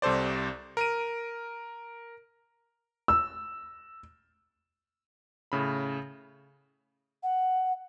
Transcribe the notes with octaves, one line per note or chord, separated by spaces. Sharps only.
C2 C3 A4 C5 D5
A#4 D7 D#7
E6
A2 C#3 B5
F#5